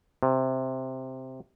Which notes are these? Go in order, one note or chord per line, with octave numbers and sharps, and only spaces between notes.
C3